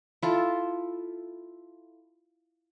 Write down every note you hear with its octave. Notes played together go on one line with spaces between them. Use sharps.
E4 F4 A4